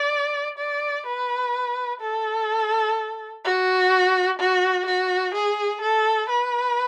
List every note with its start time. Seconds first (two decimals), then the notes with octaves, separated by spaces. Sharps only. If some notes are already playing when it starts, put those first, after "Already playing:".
Already playing: D5
0.58 D5
1.06 B4
2.01 A4
3.44 F#4
4.39 F#4
4.86 F#4
5.34 G#4
5.81 A4
6.29 B4